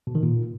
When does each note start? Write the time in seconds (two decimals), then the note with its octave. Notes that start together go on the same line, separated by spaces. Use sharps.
0.07 B2
0.15 D#3
0.23 A#2